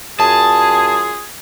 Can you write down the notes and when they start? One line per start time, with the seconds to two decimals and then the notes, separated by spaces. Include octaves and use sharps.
0.20 F#2 F4 G#4 A5